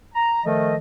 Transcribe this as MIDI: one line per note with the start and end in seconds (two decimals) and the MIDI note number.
0.14 0.43 82
0.45 0.76 51
0.45 0.76 53
0.45 0.76 57
0.45 0.76 69
0.45 0.76 75